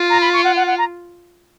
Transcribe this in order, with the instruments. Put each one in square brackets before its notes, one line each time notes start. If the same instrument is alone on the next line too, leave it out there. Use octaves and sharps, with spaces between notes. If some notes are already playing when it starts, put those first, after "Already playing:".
Already playing: [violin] F4
[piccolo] A#5
B5
C#6
F#5
F#5
F#5
A#5